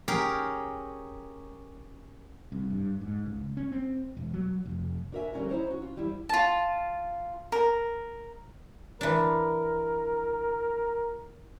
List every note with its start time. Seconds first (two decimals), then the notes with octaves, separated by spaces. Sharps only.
0.08 C#4 G4 G#4 A#4
2.52 C2
2.70 G2
3.01 G#2
3.26 C#2
3.57 C#4
3.72 C4
4.17 E1
4.34 F#3
4.65 F1
5.12 D4 F#4 A#4 C5 E5 G#5
5.33 D3 F3 G3 C#4 F4 A#4
5.49 D#4 E4 F#4 C5 C#5 A#5
5.67 C#4 F#4
5.82 F4
5.96 F3 G3 E4
6.29 F4 A5
7.52 A#4
9.01 E3 D4 A#4